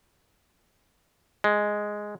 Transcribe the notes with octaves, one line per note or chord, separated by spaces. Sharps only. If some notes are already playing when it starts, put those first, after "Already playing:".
G#3